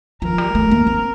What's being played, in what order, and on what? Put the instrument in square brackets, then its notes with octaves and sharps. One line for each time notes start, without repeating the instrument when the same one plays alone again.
[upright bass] F3 [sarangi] A#4
[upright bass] G3
A3
A#3
C4